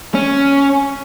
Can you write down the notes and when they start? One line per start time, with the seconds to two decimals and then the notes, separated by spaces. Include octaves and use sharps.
0.15 C#4